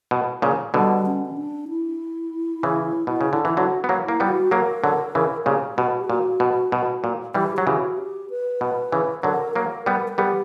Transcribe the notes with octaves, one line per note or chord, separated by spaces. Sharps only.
B2
A#2 C#3
B2 D3 G3
C#4
C#4
D4
E4
C#3 E3
B2
C#3
D3
E3 E4
D3 F#3 F#4
B3
F#3 A#3
A#3 E4
G3 B3
F#4
F#3 A#3 A#4
D3 F#3
C#3 E3
A#2 C#3 G4
B2 F#4
G4
A#2 F#4
B2
B2
A#2
E3 G3 G4
F#3 G4
C#3 E3 F#4
G4
B4
B2
C#3 E3
D3 F#3 A#4
F#3 A#3 A#4
G3 B3 A#4
A#4
G3 B3 G4